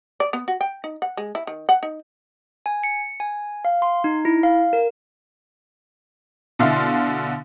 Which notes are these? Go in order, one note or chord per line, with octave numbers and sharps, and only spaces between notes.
D5
B3
F#4
G5
D#4
F#5
G#3
E4
D#3
F#5
D#4
G#5
C#7
G#5
F5
C6
D#4
E4
F5
A#4
B2 D3 E4 F5 C6